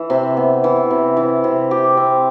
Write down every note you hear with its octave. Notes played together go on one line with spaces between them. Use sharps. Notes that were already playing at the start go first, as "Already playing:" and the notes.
Already playing: E3
C3
B3
E3
C3
E3
C3
G4
C4